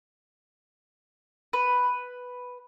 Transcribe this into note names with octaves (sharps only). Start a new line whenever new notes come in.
B4